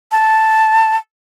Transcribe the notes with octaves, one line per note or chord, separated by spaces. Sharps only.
A5